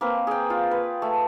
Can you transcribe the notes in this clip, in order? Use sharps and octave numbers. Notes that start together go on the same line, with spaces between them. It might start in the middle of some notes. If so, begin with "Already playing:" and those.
A#3 C4 A#4 B4
G#4 G5
F4
B4
A3